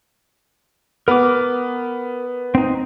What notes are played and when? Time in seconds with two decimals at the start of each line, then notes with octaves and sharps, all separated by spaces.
1.08 B3 A#4 D6
2.55 C4 D#4